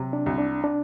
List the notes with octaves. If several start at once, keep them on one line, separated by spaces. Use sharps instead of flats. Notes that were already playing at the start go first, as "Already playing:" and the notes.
Already playing: C3 F#3
D4
C2
D4
D4